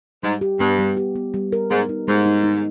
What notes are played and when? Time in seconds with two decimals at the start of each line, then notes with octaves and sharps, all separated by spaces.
0.23 G#2 G3
0.41 G4
0.60 G2 B3
0.79 G3
0.97 G4
1.15 B3
1.34 G3
1.52 A#4
1.70 G#2 B3
1.89 D#4
2.08 G#2 G#3
2.26 D#4
2.44 D#4